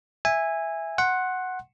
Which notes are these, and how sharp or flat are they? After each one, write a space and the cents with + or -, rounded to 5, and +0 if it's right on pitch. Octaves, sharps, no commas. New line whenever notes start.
E5 +0 G#5 -15
F#5 +0 C6 +25